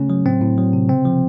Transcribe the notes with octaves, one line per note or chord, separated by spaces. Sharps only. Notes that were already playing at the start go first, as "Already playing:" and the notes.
Already playing: C#3 A3 C#4
F#3
A2 C4
A2
F#3
C3
C#3 C4
F3